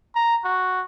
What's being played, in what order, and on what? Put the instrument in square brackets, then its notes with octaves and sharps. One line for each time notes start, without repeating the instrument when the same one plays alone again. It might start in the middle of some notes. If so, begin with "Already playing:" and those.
[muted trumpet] A#5
F#4